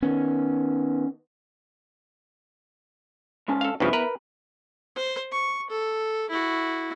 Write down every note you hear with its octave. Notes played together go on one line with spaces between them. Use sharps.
D#3 B3 C#4
G#2 C#4 A5
A4 F5
G2 C#3 F3 B3 E4
A#4 B4
C5
C#6
A4
E4 F#4